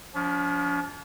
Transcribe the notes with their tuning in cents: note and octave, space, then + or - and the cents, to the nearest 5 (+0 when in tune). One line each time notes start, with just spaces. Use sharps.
F3 +25 D4 -45